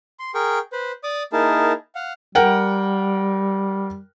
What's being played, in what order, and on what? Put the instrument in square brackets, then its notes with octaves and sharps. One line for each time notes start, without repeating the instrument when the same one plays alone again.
[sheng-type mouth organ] C6
G#4 A#4 G5 C#6
B4 C5
D5 D6 D#6
A#3 D#4 E4 G#4 A#4 A5
F5 F#5
[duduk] G3 [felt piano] A#4 F#5 G5